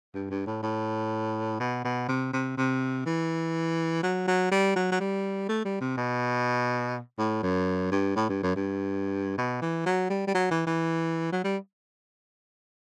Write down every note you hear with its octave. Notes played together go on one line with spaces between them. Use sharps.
G2
G2
A2
A2
B2
B2
C3
C3
C3
E3
F#3
F#3
G3
F#3
F#3
G3
A3
G3
C3
B2
A2
F#2
G2
A2
G2
F#2
G2
B2
E3
F#3
G3
G3
F#3
E3
E3
F#3
G3